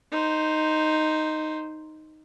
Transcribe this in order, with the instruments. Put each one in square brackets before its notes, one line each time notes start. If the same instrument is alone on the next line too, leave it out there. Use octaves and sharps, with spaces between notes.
[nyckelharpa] D#4 C5